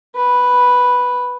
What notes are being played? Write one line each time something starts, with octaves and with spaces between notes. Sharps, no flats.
B4